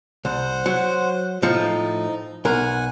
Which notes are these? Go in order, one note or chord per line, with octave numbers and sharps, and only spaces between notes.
C2 C5 F#5
F#3
A2 F3 D#4
B1 A#4 F#5 G#5